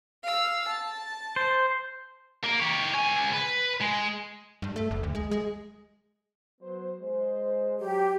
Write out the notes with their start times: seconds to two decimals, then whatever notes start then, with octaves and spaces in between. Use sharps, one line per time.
0.23 F5 E6
0.67 A5
1.36 C5
2.43 A#3 A#4
2.60 G4 C#5
2.95 C#2 G#5
3.33 B4
3.81 G#3
4.62 G2
4.76 A3
4.91 F#1
5.03 D2
5.15 G#3
5.31 G#3
6.61 F#3 B3 C5
7.01 G#3 C5
7.80 F#3 G4